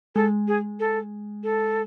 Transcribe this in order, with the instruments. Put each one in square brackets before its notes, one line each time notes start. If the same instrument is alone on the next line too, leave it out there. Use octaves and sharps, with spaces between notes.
[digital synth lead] G#3 [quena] A4
[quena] G#4
A4
A4